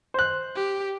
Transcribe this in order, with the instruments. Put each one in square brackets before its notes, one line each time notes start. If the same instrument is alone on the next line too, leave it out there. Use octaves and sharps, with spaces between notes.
[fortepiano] C5 F#6
[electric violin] G4